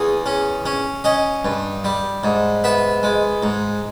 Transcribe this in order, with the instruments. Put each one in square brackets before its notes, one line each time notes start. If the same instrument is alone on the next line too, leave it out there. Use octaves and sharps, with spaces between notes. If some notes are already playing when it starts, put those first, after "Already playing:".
Already playing: [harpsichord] E2 G#4
C#4
C#4
C#4 D#5
G2
G3
G#2
B3 E5
G#3
G#2